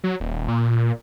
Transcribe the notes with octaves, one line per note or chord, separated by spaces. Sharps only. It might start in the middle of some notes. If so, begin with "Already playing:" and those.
F#3
D#1
A#2